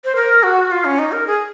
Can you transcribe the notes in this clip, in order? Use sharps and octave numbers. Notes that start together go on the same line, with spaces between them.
C5
A#4
F#4
F4
C#4
D#4
A#4
G#4